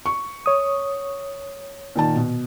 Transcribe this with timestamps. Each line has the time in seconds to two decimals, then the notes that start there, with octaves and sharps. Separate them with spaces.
0.06 C#6
0.46 C#5 D#6
1.96 A#2 D#3 A5
2.16 B2